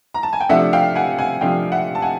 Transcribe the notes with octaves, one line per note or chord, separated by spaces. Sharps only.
A#5
A5
G#5
G5
C3 F3 A3 D4 E5 F#5
F5 G5
F#5 G#5
F#5 G#5
C3 F3 A3 D4 F5 G5
E5 F#5
A5
F#5 G#5